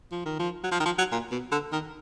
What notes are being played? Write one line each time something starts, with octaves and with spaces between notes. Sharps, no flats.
F3
D#3
F3
F#3
F3
D#3
F3
F#3
A#2
B2
D3
D#3